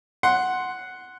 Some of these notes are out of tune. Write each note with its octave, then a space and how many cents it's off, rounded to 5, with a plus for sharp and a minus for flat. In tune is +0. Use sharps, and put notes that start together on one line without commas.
F#5 +0 C6 +0